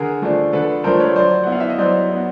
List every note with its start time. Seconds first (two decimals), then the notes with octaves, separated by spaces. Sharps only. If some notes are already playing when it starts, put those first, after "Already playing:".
Already playing: D3 G#4 A#4
0.22 F3 A3 D4
0.53 D3 A4 B4
0.84 F3 A3 D4 A#4 C5
1.00 B4 C#5
1.15 F#3 C5 D5
1.44 B3 E4 F#5
1.52 F5
1.60 E5
1.70 D#5
1.78 F#3 C5 D5
2.10 B3 E4